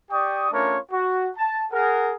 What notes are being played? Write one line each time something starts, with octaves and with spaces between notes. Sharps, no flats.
G4 D5 G5 C#6 D#6
A3 C#4 D4 F4 A#4 C#5
F#4
A5
G#4 A#4 F#5